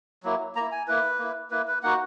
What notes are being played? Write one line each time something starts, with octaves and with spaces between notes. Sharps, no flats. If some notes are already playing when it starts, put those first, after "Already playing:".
F#3 A#3 E4
A#3 E4 A#5
G#5
A#3 E4 B4
A#3 E4
A#3 E4 B4
B4
A#3 D#4 F#4 F#5